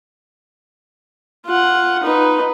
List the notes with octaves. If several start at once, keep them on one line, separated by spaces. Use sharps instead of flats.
F4 F#5
D#4 B4